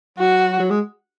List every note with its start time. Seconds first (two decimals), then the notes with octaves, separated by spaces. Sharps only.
0.18 F#3 F#4
0.60 F#3
0.71 G#3